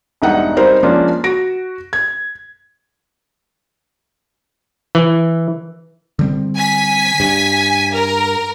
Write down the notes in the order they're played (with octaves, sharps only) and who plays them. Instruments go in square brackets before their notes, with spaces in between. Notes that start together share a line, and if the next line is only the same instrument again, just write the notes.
[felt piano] E1 G2 D#4 E5 F#5
G3 C4 D#4 A#4 C5
F3 G#3 A#3 C#4 D4 F4
F#4 A#6 D7
G#6
[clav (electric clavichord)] E3
[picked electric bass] D3 G3 C4
[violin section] G#5 B6
[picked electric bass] G2
[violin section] A#4